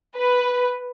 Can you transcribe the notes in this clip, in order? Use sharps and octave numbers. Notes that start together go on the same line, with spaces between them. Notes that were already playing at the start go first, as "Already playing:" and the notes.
B4